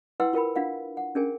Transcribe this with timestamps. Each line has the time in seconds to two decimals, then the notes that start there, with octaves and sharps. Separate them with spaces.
0.20 E4 B4 F#5 G5 C6 E6
0.33 F4 A#4 G5 B5
0.55 D4 F4 F5 F#5
0.97 F#5
1.15 C#4 D4 G#4 A#4 G5 G#5